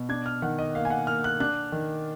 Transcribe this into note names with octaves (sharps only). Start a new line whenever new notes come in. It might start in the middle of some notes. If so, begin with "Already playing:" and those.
Already playing: B2
D4 G#6
F6
D#3 F#5
D#5
A#3 F5
G#5
F#5
A#3 F6
F#6
D4 F#6
D#3